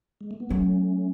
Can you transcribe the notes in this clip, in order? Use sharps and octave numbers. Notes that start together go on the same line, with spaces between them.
G#3
A3
B3
F#3 A3 C#4